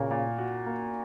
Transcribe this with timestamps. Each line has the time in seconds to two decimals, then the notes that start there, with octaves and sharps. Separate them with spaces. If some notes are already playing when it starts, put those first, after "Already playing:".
Already playing: A#2 C#3 A#3 F#4
0.11 A#2
0.38 F#4
0.66 A#3